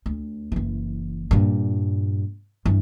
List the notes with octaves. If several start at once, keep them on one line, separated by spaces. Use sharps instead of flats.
D2
F#1 E3
G2 A#2
G2 E3